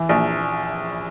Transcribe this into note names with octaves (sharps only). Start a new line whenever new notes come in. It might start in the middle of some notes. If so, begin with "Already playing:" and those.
Already playing: E3
A#1